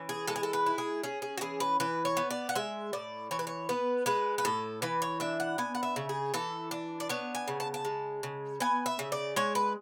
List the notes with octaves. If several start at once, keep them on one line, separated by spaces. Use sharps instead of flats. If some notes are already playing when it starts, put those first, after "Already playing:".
Already playing: E3 C#4
G#4
G#3 A4
G#4
A4
B4
E4
G#4
C#4 G#4
G#4
F#4
E3 G#4
B4
E3 B4
C#5
B3
D5
F#5
G#3 E5
A2 D5
E3 C#5
B4
C#5
B3 B4
G#3 B4
B4
A2 A4
E3 B4
C#5
D4 E5
F#5
B3 G#5
F#5
E5
C#3
G#4
E3 A4
D4
D5
B3 C#5
G#5
C#3
A5
A5
G#3
C#3
B3 G#5
E5
C#3
D5
G#3 C#5
B4